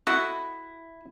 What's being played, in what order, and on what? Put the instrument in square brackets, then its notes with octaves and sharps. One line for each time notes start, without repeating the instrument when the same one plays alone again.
[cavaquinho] E4 [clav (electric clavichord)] F#4 A4 D#5